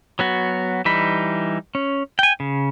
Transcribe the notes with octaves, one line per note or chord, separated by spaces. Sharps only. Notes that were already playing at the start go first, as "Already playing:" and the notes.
F#3 B3 F#4
E3 G3 D#4 B5
C#4
G5 G#5
C#3